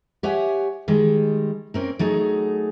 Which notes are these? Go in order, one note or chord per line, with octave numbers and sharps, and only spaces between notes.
G4 C#5 E5 F#5 G#5
D#3 G3 G#3
A#3 C4 C#4 A#4
F#3 A3 D#4 G#4